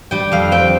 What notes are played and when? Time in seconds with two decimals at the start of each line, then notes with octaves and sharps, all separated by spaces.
0.11 G3 G5
0.32 F2 F5
0.52 C4 G5